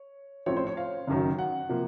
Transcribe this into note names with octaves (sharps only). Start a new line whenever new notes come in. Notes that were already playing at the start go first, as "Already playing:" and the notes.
Already playing: C#5
A1 A2 F3 A3 C4 C#5
C5
C#5
F5
F#1 F#2 D#3 F#3
F#5
C3 F3 A#3